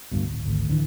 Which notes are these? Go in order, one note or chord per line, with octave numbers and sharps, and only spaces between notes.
D2 G2 B2
D1
G#1 D2
D1 D3 E3